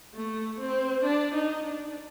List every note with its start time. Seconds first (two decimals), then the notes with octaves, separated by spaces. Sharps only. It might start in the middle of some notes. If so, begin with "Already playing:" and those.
0.14 A3
0.60 C4
1.04 D4
1.34 D#4
1.64 D4